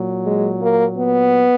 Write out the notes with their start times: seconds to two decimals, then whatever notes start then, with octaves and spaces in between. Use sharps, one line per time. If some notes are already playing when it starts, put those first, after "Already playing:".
Already playing: A#2 F#3
0.26 G#3
0.62 A#3
0.97 B3